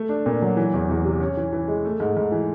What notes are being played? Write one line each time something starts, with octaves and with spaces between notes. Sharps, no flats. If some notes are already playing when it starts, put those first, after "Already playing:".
Already playing: A3
D4
A#2
F#3
E3
E2
E2
C3
C#4
E3
E3
G#3
A3
G#2
G#2
E3